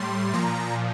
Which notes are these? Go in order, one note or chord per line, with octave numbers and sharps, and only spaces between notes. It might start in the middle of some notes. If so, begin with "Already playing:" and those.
Already playing: A2 G3 C6
A#2 F3 A#5